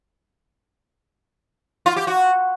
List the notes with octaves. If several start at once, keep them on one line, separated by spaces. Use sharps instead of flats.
F4
G4
F#4